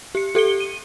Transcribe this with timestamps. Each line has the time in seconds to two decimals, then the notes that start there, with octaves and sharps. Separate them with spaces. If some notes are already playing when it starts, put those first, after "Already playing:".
0.15 G4 C#7
0.35 G4 A4 C#7 G7
0.60 D#7